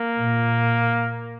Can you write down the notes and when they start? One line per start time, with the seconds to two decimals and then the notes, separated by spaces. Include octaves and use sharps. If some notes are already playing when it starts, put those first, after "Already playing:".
Already playing: A#3
0.17 A#2